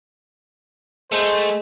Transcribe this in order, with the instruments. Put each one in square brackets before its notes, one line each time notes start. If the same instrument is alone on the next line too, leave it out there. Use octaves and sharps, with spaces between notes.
[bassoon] G#3 [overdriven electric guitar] A3 [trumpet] C5